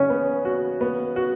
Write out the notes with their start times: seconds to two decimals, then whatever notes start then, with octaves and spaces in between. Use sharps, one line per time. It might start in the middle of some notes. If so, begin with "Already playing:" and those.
Already playing: C#3 C#4
0.10 B3
0.45 F#4
0.81 B3
1.16 F#4